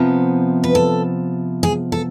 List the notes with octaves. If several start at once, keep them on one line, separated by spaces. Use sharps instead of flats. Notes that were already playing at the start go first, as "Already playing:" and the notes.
Already playing: C3 F3 B3
B4
A4
G#4
A4